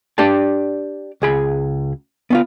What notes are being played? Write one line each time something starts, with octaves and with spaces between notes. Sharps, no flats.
D4 G4 D5 A5
C#2 G#4 B5
B3 C#4 F4